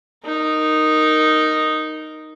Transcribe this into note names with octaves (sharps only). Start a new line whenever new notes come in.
D#4 A#4